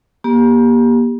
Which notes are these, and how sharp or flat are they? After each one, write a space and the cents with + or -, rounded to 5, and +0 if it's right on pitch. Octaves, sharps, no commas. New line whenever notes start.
A#3 +35 G4 +10